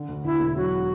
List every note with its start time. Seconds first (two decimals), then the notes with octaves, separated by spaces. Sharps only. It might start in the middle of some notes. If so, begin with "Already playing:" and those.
Already playing: D3
0.09 D2
0.24 D2 E4
0.40 E1
0.56 F#3 F#4